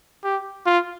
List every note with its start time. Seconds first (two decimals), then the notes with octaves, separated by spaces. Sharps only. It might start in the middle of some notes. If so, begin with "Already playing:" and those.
0.24 G4
0.66 F4